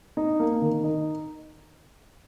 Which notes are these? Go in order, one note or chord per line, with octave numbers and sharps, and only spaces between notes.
D#4
A#3
D#3
D#4